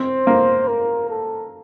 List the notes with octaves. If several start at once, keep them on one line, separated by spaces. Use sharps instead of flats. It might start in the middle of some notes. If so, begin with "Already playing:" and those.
Already playing: C4 C5
A#3
A#4
A4